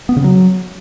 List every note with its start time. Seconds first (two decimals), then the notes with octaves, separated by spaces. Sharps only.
0.09 B3
0.17 C#3
0.24 F#3